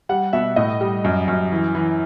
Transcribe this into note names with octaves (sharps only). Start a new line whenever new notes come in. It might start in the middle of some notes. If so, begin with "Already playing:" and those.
G3 F#5
B2 E5
A2 D#5
G3
F#2
F#2
E3
E3